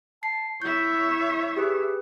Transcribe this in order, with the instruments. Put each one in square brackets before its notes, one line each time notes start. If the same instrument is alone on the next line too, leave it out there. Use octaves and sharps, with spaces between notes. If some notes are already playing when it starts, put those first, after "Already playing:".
[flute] A5 [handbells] C7
[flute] E4 [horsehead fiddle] C#5 E5 [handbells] G6
[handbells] G4 G#4 B4